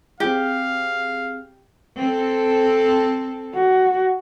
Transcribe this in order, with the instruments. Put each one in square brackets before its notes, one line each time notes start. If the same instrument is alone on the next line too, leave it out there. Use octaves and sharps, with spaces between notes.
[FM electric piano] C4 G#4 [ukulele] G4 [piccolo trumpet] F5
[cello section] C4 A4
[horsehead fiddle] F#4